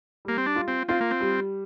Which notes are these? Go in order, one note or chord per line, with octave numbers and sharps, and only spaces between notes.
G3 A#3
C4
D4
F4
C4
C4 F4
A#3
C4
G3